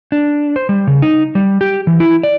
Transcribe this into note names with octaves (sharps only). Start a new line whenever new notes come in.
D4
C5
G3
C#3
D#4
G3
G4
E3
E4
D5